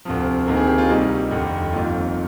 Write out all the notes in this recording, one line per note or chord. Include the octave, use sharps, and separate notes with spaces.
D2 C3 F3
D2 C3 D#3 A#3 A#4
G#4
G4
F4
C2 C3 G3 A#3 D#4
F1 D#2 D3
G1 F2 D#3 A#3 F4